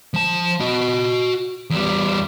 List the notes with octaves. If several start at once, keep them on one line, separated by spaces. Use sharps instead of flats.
F3 A5
F#4 D#5
E2 G3